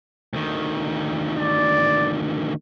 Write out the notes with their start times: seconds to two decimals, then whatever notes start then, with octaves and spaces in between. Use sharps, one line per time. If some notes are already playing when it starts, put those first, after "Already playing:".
0.33 D2 D#3
1.37 D5